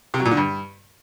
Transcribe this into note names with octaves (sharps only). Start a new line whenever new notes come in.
C3
F#3
A#2
D3
G2